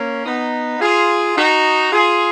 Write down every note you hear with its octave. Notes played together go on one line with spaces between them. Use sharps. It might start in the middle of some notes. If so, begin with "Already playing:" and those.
Already playing: A#3 C#4
B3 D#4
F4 G#4
D#4 F#4
F4 G#4